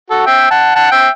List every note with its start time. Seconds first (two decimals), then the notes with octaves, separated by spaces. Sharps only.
0.10 F#4 A4
0.26 E5 G5
0.51 F#5 A5
0.75 F#5 A5
0.91 E5 G5